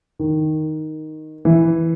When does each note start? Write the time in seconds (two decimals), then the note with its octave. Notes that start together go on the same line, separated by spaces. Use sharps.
0.19 D#3
1.45 E3